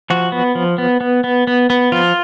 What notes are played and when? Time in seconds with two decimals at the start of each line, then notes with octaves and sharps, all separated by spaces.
0.10 F3 F#4
0.32 B3
0.55 F3
0.78 B3
1.01 B3
1.24 B3
1.47 B3
1.70 B3
1.92 F3 F4